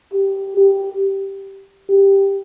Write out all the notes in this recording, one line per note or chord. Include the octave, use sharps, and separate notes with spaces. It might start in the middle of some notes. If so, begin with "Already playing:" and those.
G4
G4
G4